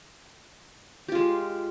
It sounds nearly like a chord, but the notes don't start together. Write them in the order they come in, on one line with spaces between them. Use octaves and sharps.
G4 F4 G#3